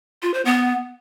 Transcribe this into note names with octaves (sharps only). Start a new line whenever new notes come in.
F4
C5
B3